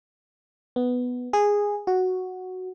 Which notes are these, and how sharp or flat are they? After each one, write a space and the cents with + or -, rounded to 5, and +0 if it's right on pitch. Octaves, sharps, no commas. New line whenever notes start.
B3 +5
G#4 -10
F#4 +0